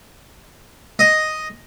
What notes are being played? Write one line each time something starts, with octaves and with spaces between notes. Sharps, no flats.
D#5